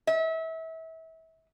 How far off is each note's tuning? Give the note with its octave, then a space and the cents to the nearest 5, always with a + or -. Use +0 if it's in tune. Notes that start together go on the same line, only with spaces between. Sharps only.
E5 -30